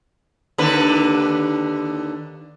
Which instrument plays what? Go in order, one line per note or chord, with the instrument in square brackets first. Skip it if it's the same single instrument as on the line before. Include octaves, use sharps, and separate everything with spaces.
[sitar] D#2 D3 B4